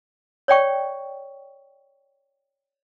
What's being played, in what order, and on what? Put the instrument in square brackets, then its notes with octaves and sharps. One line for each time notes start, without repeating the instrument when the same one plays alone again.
[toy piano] C#5 D5 G5 C#6